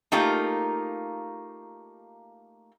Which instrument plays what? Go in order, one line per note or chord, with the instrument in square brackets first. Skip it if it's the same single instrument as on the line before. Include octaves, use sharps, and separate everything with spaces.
[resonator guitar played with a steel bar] A3 A#3 D#4 F4 G4